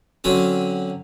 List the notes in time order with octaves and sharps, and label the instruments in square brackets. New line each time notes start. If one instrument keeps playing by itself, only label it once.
[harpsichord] D3 F#3 C4 C#4